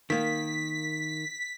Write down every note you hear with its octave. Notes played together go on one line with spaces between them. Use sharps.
D#3 A#3 B6